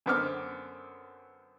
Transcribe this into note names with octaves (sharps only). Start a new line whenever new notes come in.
F#2 D3 B3 C4 D6 F6